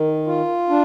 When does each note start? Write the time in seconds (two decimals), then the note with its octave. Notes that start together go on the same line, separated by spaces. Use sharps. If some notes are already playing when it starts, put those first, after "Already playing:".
Already playing: D#3
0.27 F4
0.69 D4